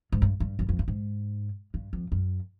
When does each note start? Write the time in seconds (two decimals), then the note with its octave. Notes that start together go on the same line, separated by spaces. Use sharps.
0.12 G#2
0.22 G2
0.40 G2
0.59 F#2
0.69 F2
0.79 G2
0.88 G#2
1.74 G2
1.93 F2
2.12 F#2